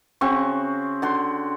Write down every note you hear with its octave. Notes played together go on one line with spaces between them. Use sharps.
C#3 C4 F#4 C#6
D3 F#4 C6